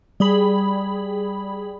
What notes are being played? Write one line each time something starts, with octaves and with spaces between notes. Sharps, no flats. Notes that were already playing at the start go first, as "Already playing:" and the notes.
G3 G#4 B5